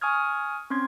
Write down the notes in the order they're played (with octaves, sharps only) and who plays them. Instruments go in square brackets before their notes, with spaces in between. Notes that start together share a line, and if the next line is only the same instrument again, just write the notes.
[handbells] G#5 C#6 D#6 F6 G#6
C4 C#4 C6 G#6